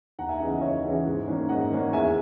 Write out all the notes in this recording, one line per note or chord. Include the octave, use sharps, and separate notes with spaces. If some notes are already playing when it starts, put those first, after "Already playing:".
D#2 F#5 A#5
E5 G#5
C#3 E3 D#5
D#5
D#2 C#5 E5
C#3 E3
G#2
D#3 A#3 C#4
G#2 D#5 F#5
D#3 A#3 C#4
E2 E5 G#5